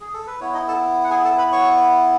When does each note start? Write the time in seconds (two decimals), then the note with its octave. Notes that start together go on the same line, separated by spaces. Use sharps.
0.01 G#4
0.14 A4
0.27 B4
0.40 B3 E4 C#5
0.54 D#4 D#5
0.68 A4 A5
1.04 F#5
1.10 G#4 G#5
1.24 A4 A5
1.38 B4 B5
1.52 C#5 C#6